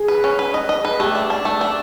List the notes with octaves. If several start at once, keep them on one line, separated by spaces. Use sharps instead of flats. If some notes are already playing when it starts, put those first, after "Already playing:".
Already playing: G#4
B4
C#4
B4
D#5
D#5
B4
A3 G4
D4
D4
A3
D4